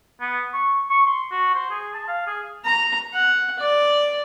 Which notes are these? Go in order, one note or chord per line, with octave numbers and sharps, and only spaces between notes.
B3
C#6
C#6
C6
F#4
C5
G#4
A5
F5
G#4
A#5
F#5
D5